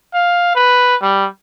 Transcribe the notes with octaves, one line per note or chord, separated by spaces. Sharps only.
F5
B4
G3